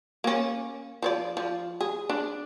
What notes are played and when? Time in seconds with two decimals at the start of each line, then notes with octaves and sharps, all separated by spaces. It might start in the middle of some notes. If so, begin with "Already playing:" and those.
0.24 A#3 C#4
1.02 F3 C5 D5
1.37 F3
1.81 G#4
2.10 D4